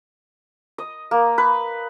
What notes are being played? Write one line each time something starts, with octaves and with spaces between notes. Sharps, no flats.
D#5
A#3
B4